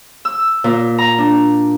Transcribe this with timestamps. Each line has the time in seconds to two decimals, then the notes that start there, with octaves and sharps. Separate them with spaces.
0.25 E6
0.64 A#2
0.98 A#5
1.18 D4